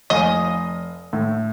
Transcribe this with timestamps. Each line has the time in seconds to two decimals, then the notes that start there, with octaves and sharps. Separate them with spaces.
0.10 F1 D#5 F5 G#5
1.13 A2